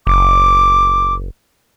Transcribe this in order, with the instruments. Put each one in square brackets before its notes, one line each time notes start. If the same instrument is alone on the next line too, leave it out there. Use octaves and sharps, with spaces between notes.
[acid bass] F#1 [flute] D6